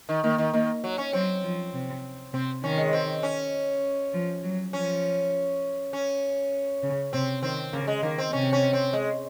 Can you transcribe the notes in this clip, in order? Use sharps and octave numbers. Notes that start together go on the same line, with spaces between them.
D#3
D#3 A#3
D#3
D#3 A#3
F#3
C#4
F#3 C4
F3
C3
C3 C4
D#3 C#4
G#3
C4
C#4
F3
F#3
F3 C#4
C#4
C#3
C3 C4
D#3 C4
C#3 A#3
G#3
D#3 A#3
C4
C3 C#4
C#4
C4
G#3